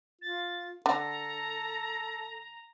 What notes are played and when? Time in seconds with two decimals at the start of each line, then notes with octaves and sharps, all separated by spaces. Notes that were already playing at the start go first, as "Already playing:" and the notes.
0.22 F4 A6
0.86 D3 A4 A#5